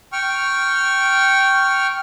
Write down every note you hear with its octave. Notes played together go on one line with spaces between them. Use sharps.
G5 C#6 F6